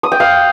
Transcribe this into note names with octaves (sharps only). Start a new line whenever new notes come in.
D#6
G5
F5